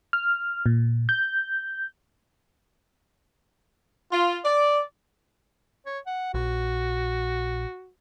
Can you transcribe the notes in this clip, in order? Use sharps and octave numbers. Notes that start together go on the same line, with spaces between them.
F6
A#2
G6
F4
D5
C#5
F#5
A#1 F#4